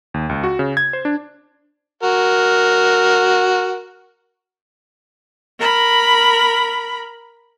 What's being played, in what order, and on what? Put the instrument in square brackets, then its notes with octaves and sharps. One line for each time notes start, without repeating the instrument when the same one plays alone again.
[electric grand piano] D#2
C#2
F#4
C#3
G#6
C5
D4
[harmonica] F#4 A#4
[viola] A#4 B5